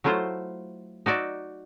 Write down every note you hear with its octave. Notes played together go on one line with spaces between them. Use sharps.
F#3 A3 E4 F4 C5
D#4 F#4 D5 E5